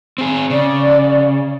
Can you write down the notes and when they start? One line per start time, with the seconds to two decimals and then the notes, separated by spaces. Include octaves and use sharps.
0.18 C4 G#4
0.50 C#3 D5